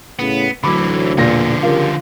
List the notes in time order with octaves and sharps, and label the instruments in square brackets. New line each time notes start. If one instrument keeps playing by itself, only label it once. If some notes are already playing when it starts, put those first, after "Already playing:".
[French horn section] A2 C#3 [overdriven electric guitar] B3
[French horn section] D2 F#3 [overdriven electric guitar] D3 E3 [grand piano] B5 D6
[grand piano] E1 A#2 A#6 [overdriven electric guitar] D3 F3
[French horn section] C#3 G3 A#4 [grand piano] F4